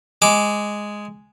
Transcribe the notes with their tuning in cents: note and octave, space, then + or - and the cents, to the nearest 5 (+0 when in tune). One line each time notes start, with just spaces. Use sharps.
G#3 +0 D6 +0